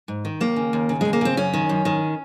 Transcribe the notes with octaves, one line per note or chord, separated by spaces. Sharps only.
G#2
D#3
D#2 A#3
C#3
D#2
C#3
D#2 G#3
A#3
C#3 C4
F#2 C#4
D#3
F#2
D#3